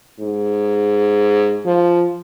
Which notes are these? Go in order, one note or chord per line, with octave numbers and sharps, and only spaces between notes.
G#2
F3